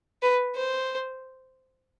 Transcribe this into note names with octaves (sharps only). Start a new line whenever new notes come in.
B4
C5